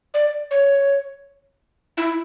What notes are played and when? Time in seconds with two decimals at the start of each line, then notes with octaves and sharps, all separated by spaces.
0.14 D5
0.51 C#5
1.97 E4